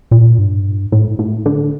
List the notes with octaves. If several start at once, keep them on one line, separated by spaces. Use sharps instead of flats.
A#2
G2
A2
A2
D3